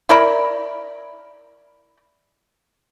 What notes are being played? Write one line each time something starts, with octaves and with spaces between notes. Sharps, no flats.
E4 A#4 D5 B5